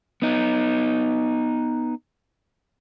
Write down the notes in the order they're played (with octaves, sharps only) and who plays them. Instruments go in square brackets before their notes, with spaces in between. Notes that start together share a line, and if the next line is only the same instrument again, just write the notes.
[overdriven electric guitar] B3 D#4